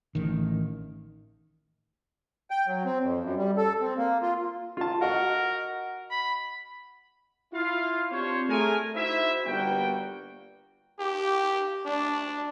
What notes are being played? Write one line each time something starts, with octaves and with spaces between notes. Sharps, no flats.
A1 D#3
G5
F#3
C4
F2
F#2
G3
A4
C4
A#3
F4
F4 A5
F#4 A#4 D#5 F#5
B5
E4 F4 F5
C4 D4 F4 G4 C5 C#5
A3 G#4 A#4 G#5
D#4 E4 F#4 C5 E5
G1 G3 A#3 B3 F#4 G5
G4
D4